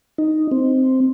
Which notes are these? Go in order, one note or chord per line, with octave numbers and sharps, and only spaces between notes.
D#4
C4